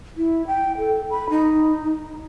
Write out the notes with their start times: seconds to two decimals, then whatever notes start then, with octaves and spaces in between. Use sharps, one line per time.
0.17 E4
0.47 G5
0.78 A4
1.10 B5
1.30 D#4